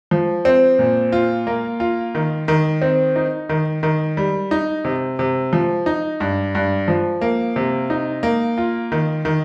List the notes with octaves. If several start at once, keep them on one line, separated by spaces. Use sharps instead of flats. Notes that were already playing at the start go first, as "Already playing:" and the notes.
F3
C4
A#2
F4
A#3
F4
D#3
D#3
C4
D#4
D#3
D#3
G3
D#4
C3
C3
F3
D#4
G2
G2
F3
A#3
C3
D#4
A#3
F4
D#3
D#3